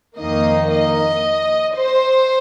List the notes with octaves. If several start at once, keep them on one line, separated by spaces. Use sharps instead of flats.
F2 D#3 A#3 D#4 D#5
D#5
C5